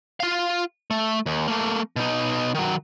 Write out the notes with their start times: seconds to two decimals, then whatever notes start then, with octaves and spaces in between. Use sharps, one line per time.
0.20 F4 F5
0.91 A3
1.26 D#2
1.47 A3 A#3
1.96 B2 D#4
2.55 D#3 F#3